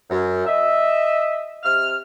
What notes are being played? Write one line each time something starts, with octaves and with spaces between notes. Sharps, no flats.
F#2
D#5 E5
C3 E5 F6